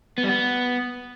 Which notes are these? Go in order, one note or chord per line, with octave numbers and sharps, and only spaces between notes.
B3
G3
B3